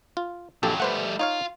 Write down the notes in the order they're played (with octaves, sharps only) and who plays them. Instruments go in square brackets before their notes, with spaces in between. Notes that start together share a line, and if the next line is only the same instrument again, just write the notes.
[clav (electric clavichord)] F4
[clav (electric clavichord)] A#1 G4 A4 [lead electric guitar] F2 F#3
[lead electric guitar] G3 A3 [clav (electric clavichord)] B4 C5 F#5
[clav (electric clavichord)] D#4 C#5 F5 [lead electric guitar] F4